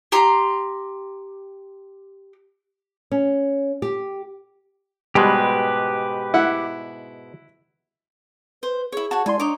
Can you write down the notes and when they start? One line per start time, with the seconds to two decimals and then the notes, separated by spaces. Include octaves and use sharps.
0.12 G4 A#5 C6
3.11 C#4
3.82 G4
5.15 G#2 B2 G3 G#3 G4 B4
6.34 E4 F#5
8.63 B4 C5
8.92 E4 G#4 C#5
9.11 F#4 C#5 F#5 A5
9.26 G#3 E4 D5 G#5 C6
9.40 D4 D#4 C#5 D6